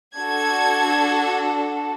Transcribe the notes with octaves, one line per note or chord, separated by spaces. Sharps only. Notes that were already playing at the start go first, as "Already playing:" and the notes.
D4 F#4 A4 G#6